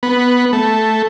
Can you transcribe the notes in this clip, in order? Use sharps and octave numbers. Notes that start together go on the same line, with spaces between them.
B3
A3